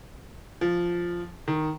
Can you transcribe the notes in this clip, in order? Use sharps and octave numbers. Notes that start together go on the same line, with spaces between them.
F3
D#3